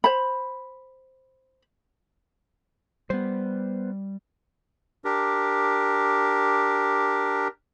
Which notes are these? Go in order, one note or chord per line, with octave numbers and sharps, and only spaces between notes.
C5 B5
G3 B3 C5
D4 G4 A#4